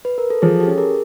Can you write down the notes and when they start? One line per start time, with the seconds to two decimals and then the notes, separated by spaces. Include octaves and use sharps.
0.05 B4
0.18 A#4
0.30 A4
0.42 F3 G#4
0.60 G4 A4
0.66 C#4
0.78 G#4 A#4